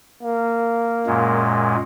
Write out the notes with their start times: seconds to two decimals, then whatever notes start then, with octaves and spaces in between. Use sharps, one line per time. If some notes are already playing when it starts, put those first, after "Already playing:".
0.23 A#3
1.07 F#2 A#2 G#3